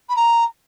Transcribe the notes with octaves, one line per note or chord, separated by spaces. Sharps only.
B5
A#5